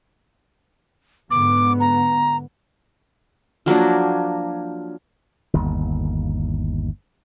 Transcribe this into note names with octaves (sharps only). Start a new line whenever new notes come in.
G#2 D3 B3 D6
A#5
F3 F#3 A#3 D4
G1 D#2